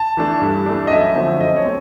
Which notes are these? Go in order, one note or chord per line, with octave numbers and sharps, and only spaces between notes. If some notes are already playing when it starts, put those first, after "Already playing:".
Already playing: A5
E3 A3 D4
G2
E3 A3 D4
D#5
F#2 E5
D3 F3 A3 C4
F#2 D#5
C#5
A3 C4